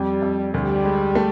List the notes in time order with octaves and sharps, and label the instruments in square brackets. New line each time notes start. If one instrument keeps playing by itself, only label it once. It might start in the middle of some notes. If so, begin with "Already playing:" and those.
Already playing: [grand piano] F2 [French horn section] G3
[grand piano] F2
[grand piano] D2 [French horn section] G3
[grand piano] G#3
A3